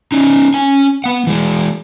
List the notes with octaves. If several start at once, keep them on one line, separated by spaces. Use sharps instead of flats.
C#4 D#4
C#4 G#5
B3 F#5
E3 G#3